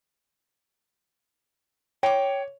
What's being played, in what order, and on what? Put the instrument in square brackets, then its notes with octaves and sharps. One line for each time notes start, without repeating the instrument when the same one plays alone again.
[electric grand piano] C#5 [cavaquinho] G5 D6